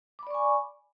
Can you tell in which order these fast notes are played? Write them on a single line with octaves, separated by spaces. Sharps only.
D6 B5 D5 C#6 G#5